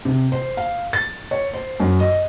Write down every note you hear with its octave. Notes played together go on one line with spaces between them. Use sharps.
C3
C5
F5
A6
C#5
C5
F#2
D#5